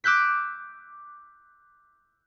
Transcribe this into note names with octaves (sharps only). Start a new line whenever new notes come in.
D6 E6 F#6 G6 B6